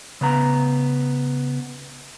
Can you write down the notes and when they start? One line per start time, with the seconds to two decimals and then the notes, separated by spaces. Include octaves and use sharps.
0.21 C#3 B3 A#5